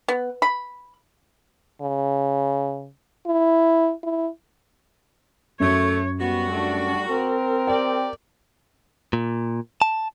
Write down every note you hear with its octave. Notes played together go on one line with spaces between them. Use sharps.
B3
B5
C#3
E4
E4
F#2 A3 C#5
G3 B3 F#4
A3 D4
C4 A#4
G4 D5 G5
A#2
A5